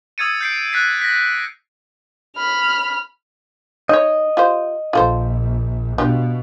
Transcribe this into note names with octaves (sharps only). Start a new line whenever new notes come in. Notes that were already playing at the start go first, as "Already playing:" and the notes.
D#6 E6 G#6 A6 C#7 D#7
G6 C7 D7
F#6 A6 B6 C7
A#6 B6
B5 F6
D#4 C#5 D#5
F4 G4 C5
A#1 F4 A4 C5
B2 D4 F4 G4